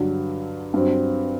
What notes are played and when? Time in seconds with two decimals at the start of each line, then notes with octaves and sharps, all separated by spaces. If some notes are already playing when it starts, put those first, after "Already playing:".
Already playing: G2 D3 F#3
0.74 G2 F#3 C4